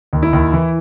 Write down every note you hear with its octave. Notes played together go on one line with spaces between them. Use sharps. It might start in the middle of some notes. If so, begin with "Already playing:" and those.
D#2
E4
D#2
E3